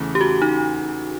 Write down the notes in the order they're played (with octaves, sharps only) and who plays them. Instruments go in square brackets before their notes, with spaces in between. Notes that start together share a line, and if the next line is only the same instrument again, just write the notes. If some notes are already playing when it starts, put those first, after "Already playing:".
Already playing: [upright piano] E2 C#3 E3 A3
[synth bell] G4
F#4
D#4